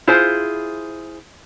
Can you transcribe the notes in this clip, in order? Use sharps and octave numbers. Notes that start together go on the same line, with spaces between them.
E4 F4 G#4 C5